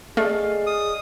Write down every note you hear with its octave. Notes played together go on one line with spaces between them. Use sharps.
A3 G#4 D5 D#5 F5
D#6